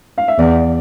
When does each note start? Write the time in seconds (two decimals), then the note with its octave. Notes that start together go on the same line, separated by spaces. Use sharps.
0.18 F5
0.28 E5
0.39 E2 D5